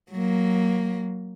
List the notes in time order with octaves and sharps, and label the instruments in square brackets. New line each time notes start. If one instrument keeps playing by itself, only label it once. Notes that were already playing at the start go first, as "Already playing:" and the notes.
[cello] F#3 A#3